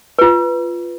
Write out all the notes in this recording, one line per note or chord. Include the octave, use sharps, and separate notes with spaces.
F4 B4